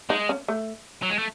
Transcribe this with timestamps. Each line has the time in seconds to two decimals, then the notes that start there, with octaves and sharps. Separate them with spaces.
0.09 G#3 D#4
0.29 C#4
0.48 A3
1.02 F#3
1.10 G#3
1.18 A3